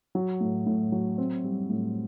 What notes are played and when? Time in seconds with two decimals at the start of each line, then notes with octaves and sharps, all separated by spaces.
0.15 F#3
0.41 A2
0.66 A2
0.92 F#3
1.18 C4
1.44 G3
1.69 A2